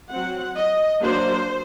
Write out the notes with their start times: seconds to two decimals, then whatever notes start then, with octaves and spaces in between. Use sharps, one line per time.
0.11 F#3 C4 F#5
0.57 D#5
1.01 F#3 A#3 D4 C5